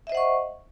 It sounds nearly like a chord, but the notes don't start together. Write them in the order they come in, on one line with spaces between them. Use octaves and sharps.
E5 D#5 C5 F#5 C#6